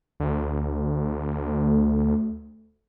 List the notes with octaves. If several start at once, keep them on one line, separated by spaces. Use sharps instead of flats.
D2
A3